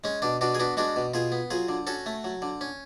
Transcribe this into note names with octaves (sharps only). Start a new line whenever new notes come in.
G#3 C#4
B2 D4
B2 D4 F#4
G#4
B3 D4 F#4
G#3 D4 F#4
B2
B2 F4 G#4
B3
F#3 F4 G#4
D3
C#4 F#4 A4
A3
F#3
D3
C#4